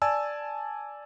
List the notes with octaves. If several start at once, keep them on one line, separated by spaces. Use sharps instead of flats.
D5 G#5 A5 E6